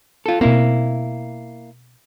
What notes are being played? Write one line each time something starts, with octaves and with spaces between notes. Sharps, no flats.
F4 A4
B2 A#3 C4 E4